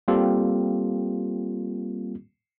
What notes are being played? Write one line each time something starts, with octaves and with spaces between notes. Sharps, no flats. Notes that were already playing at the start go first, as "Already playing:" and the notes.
G3 A#3 C4 F4 G4 A4